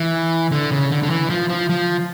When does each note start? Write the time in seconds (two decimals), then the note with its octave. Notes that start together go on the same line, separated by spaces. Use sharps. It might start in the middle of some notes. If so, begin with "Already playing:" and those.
Already playing: E3
0.51 D3
0.71 C#3
0.91 D3
1.03 D3
1.10 E3
1.30 F3
1.49 F3
1.69 F3